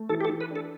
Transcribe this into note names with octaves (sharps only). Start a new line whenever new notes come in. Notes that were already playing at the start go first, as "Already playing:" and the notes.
Already playing: A3
E3 A4
G4
A4
E3
B4
D4 A4